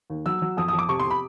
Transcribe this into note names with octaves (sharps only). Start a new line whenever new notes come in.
D#2
F#3 E6
F#3
F2 D#6
F2 D#6
D6
C3 C#6
C6
C3
B5